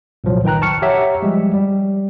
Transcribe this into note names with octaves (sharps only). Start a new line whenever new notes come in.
C2 A#2 F3 F#3
D#3 B4 G5 A#5 F#6
A5 C#6 F6 C#7
G4 C#5 E5 F#5 A#5
F3 G3 G#3
G3